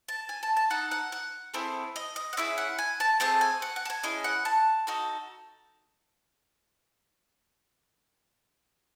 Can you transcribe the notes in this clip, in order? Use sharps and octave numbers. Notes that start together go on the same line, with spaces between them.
A5
G#5
A5
A5
D#4 A4 F#5
F#5
F#5
A3 C4 E4 G#4
D#5
D#5
F#5
C#4 E4 G#4 E5
F#5
G#5
A5
A3 C4 G#4 A5
G#5
F#5
F#5
A5
G#5
C#4 E4 G#4 D#5
F#5
A5
D#4 F#4 A4